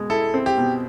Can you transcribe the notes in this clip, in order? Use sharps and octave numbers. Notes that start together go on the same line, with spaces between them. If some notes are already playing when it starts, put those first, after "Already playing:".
Already playing: B2 G#3
E4 A4
C4
G4
B2